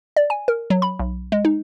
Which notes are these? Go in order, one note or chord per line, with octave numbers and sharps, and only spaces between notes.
D5
G#5
A#4
F#3
B5
B1
G#3
D#4